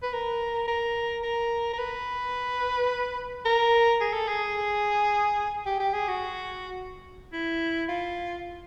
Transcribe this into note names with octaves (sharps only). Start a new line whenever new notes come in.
B4
A#4
A#4
A#4
A#4
B4
A#4
G#4
A4
G#4
G4
G4
G#4
F#4
E4
F4